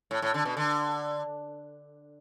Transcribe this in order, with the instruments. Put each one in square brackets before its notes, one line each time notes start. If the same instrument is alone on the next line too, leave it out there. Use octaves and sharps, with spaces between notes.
[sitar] A2
A2
D3
B2
D3